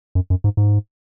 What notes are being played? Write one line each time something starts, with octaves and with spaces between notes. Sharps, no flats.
F#2
F#2
G#2
G#2